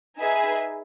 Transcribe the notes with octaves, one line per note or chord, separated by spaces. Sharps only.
D#4 G#4 B4 E5 G#5